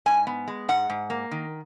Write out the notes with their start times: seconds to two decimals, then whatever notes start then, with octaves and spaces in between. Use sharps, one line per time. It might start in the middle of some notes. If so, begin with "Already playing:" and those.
0.06 G#2 G#5
0.27 B3
0.48 G#3
0.69 G#2 F#5
0.90 G#2
1.10 A#3
1.31 D#3